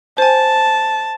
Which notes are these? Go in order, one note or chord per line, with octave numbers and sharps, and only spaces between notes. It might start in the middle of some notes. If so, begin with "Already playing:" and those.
C5 G#5 A5